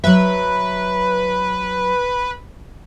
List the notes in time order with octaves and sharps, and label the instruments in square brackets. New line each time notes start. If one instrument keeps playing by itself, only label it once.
[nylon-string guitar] F#3 E5 [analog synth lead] B4